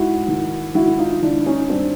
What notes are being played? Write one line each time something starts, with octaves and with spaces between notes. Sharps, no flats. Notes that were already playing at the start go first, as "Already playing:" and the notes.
Already playing: G#2 E4 F#4
D#3
G#1 E4 F#4
D#4 F4
G#1 D4 E4
C#4 D#4
G2 C4 D4